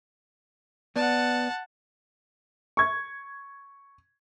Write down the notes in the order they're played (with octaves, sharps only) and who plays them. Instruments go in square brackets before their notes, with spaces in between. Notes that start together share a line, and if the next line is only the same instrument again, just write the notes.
[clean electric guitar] B3 D5 [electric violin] F#5 A5
[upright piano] C#6 G#6